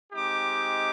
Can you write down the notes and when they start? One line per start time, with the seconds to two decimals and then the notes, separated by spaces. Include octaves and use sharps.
0.12 G#3 C4 D#4 G4 D6